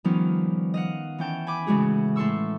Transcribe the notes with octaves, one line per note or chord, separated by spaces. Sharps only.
D#3 F3 G3 B3 C#4 D#4
D#5 F5 F#5
E3 C#4 G5 A5
G#5 B5 D6
A2 C#3 E3 G#3 F#4 G#4
A2 A4 C6 C#6 E6